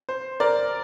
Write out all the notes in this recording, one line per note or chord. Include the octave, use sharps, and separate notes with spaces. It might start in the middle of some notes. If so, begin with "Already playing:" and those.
C5
A#4 D5